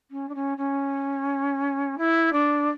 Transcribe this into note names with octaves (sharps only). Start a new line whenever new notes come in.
C#4
D4
C#4
C#4
E4
D4